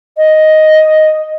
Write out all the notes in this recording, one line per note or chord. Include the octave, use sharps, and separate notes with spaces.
D#5